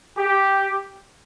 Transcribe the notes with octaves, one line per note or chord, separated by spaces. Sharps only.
G4